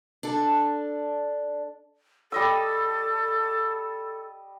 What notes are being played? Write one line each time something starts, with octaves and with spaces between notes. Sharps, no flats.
D4 A4
G3 A4 D#5 E6